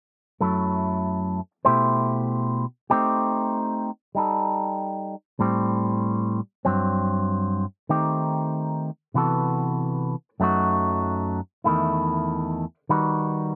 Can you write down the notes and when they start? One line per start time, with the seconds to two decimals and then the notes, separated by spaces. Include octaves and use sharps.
0.41 F#2 F#3 A3 E4 A4
1.65 B2 A3 E4 G4 C5
2.90 A3 C4 D#4 G4
4.15 G3 D#4 A4
5.40 A2 G3 C4
6.65 G2 F#3 C4
7.89 D#3 A3 C4 D#4 G4
9.14 C3 E3 B3 F#4 A4
10.40 F#2 F#3 A3 D#4 F#4
11.64 E2 D#3 A3 E4
12.89 D#3 G3 D#4 F#4 B4